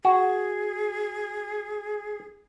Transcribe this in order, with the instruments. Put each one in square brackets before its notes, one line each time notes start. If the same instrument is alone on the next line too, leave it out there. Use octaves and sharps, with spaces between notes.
[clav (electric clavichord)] F#4 [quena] G#4